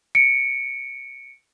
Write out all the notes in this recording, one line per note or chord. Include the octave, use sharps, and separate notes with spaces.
C#7 D7